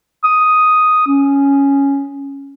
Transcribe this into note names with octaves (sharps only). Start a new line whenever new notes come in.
D#6
C#4